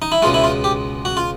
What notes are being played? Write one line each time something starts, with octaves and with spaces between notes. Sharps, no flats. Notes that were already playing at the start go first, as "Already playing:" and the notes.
D#4
E4
C#2 B2 G#3 F4
E4
F4
G4
F#4
F4